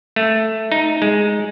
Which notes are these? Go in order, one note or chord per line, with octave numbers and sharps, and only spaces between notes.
A3
D#4
G#3